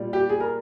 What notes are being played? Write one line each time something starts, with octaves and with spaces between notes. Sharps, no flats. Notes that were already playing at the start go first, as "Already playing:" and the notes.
Already playing: A#2 G3
G4
G#4
A#4